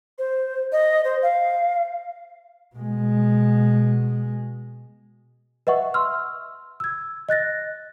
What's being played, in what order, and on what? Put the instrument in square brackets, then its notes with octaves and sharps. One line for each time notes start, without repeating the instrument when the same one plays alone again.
[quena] C5
D#5
C5
F5
[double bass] B2 G#3
[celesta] B4 D#5 E5 F#5 C#6
C6 E6 F6
E6 G#6
D#5 F#6 A6 A#6